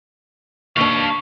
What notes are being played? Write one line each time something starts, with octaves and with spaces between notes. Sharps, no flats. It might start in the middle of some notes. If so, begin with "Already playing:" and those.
D#2 D4 B4 F5 C#6